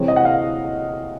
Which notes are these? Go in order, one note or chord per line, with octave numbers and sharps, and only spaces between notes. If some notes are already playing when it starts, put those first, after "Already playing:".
Already playing: C3 E3 G#3 C4 C#5
D#5
F#5
F5